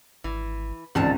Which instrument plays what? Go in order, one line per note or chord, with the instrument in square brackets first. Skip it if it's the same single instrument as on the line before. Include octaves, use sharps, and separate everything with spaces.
[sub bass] G#1 [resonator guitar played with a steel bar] E3
[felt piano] G#1 C#2 [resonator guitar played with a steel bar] A#2 G3 A5 [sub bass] E3